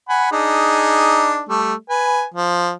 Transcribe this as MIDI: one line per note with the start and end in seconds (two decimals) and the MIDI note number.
0.09 0.31 78
0.09 0.31 80
0.09 0.31 83
0.32 1.42 62
0.32 1.42 63
0.32 1.42 68
1.49 1.74 55
1.49 1.74 57
1.90 2.25 71
1.90 2.25 80
2.34 2.71 53